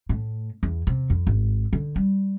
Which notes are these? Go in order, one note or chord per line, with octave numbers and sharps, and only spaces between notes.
A2
E2
C3
F2
G#1
D3
G3